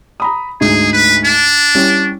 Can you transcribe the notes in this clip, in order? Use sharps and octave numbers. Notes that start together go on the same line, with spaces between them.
A#5 B5 D#6
D2 G#2 D#4 G#4
B4
D4
G3 C#4 E4